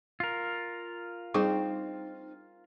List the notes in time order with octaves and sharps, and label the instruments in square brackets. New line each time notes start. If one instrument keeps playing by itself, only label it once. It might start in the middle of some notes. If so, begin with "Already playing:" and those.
[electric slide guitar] F4 A#4
[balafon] G3 G#4 C#6 [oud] C4 D#4